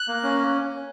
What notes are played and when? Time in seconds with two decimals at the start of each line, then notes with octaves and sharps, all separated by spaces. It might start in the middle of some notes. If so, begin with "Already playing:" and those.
Already playing: F#6
0.08 A#3
0.23 C#4